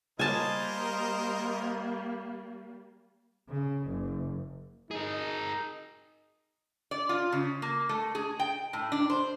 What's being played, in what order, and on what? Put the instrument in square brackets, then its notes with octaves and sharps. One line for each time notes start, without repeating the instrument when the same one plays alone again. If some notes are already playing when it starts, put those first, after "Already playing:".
[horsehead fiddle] G3 A#3 [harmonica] A#4 C5 D#5 [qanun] G#5 A5
[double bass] C#3
F#1
[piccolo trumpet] D#4 [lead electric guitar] G#4 A#4
[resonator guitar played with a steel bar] D5
F4
C#3
A#3
A3
G#4
G5
A2
D4
C5